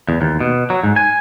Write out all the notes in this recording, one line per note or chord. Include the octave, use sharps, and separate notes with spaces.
E2
D#2
B2
F#3
G#2
G#5